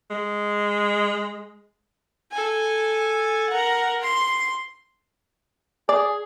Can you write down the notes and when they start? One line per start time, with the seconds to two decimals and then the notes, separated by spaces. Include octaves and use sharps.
0.11 G#3
2.31 A4 G#5
3.50 A#4 F#5
4.02 C6
5.89 G#4 D5